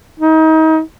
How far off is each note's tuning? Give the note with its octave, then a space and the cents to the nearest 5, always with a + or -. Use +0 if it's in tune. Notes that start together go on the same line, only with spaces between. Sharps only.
D#4 +35